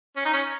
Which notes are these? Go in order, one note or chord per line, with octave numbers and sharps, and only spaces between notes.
C#4
D#4
C#4